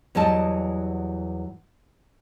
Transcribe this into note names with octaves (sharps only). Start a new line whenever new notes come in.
E2 E3 F#3 G3 D#5 A5